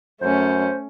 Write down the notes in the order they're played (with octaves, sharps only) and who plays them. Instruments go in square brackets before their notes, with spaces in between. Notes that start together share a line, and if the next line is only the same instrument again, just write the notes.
[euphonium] F#2 [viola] A3 C#4 [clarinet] C5